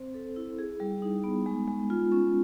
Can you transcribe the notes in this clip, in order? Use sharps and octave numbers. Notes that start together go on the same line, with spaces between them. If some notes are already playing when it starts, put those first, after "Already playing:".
Already playing: C4 C5
A4
E4
G#4
G3
D#4
B3
G#3
G#3
F4
C#4